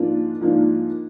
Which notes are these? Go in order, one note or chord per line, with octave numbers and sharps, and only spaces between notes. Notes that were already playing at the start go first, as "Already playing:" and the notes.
Already playing: G#2 F3 A#3 D4 F4
G#2 F3 A#3 D4 F4